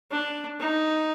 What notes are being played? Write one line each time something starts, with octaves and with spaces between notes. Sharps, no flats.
D4
D#4